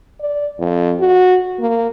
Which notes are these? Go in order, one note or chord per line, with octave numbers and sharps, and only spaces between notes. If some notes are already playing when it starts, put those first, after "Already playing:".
D5
F2
F#4
A#3